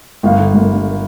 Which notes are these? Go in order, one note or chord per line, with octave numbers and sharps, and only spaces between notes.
G1 F5
D3
G1
G2